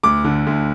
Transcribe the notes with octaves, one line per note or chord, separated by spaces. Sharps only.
D2 D6
D3
D2